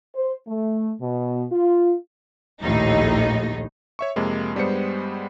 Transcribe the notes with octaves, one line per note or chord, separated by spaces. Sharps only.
C5
A3
B2
F4
A#1 D#2 A2 D#4
C#5 E5 C#6
F2 C3 G#3 A#3
G2 G3 G#3 B3 C5 C#7